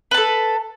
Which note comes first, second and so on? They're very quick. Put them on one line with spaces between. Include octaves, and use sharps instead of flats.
B4 A5 A4